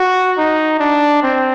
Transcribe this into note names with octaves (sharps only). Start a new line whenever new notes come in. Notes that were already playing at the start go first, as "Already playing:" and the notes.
Already playing: F#4
D#4
D4
C4